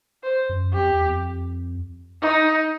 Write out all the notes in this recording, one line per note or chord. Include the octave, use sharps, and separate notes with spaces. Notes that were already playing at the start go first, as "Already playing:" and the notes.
C5
F#2
F2 G4
E2
F2
D#4